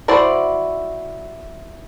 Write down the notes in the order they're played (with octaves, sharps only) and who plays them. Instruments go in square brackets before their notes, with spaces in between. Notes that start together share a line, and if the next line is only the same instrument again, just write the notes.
[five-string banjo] E4 F#4 C5 D5